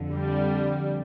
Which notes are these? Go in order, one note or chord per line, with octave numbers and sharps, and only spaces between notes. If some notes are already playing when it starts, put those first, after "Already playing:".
Already playing: F2 D3
G3